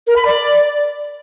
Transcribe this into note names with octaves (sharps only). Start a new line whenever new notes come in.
A#4
B5
D5